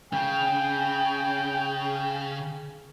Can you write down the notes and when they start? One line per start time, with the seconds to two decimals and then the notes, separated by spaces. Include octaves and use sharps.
0.13 C#3 G5